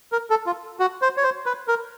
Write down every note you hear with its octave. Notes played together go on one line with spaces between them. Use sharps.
A#4
A4
F4
F#4
C5
C#5
C5
B4
A#4